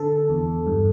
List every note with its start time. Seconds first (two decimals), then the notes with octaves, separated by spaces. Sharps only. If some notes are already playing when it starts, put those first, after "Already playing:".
Already playing: D3 A4
0.30 E2
0.67 G2